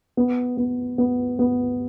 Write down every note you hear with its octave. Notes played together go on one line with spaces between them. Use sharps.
B3
B3
B3
B3